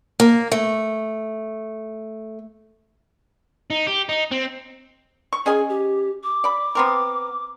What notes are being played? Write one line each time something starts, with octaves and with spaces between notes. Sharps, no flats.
A#3
A3
D#4
G4
D#4
C4
C#6
C#4 G#4 D#5 G#5
G4
D6
D5 B5
B3 C4 A#4